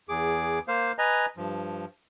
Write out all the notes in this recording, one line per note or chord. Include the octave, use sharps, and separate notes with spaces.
E2 G#4 D6
A#3 C5 F5
B4 D#5 G#5 A#5
G2 F3